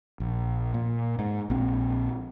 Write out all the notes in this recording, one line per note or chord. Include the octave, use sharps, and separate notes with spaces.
A#1
A#2
G#2
A#1 C4